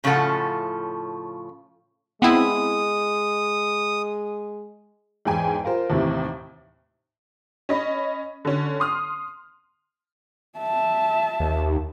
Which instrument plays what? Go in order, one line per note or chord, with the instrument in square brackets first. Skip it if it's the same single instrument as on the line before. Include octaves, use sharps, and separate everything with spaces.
[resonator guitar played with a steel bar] A2 C#3 F3 F4 A4 F#5
[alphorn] G#3 [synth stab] B3 C4 E4 [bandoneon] D#6
[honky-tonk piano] E2 G#2 G5 G#5
F4 A#4 C5
D#2 A2 C3 E3
C#4 D#5 B5
D3 C#4
C6 D#6 F6
[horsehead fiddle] E5 A5
[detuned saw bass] D#2